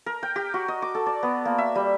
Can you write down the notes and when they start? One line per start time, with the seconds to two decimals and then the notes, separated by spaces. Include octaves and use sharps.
0.06 A#4
0.23 G5
0.36 G4
0.54 F#4
0.68 D#5
0.82 D6
0.95 A4
1.06 D5
1.23 B3
1.45 A#3
1.58 E5
1.75 G3